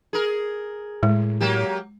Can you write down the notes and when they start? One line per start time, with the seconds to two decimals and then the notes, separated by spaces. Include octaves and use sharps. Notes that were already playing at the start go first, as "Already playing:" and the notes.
0.13 G#4 A#4
1.03 A2 G#3
1.40 F#3 A#3 G4